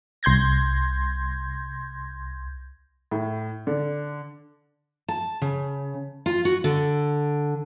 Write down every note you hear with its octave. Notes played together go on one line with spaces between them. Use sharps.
C2 C6 G6 G#6 A#6
A2
D3
A5
C#3
F4
F#4
D3